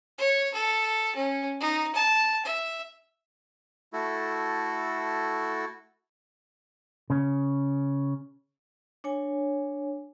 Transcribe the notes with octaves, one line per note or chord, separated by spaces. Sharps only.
C#5
A4
C#4
D#4
A5
E5
A3 E4 F#4 A4
C#3 C#4
D4 C#5 G#5